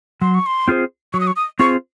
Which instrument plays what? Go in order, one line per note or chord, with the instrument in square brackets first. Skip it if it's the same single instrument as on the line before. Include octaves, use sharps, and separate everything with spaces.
[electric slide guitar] F#3 [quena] C6
[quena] C#6
C6
[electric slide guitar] C4 F4 G#4 C5
[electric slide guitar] F#3 [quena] C#6
[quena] D#6
C#6
D#6
[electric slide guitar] C4 F4 G#4 C5 [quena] C#6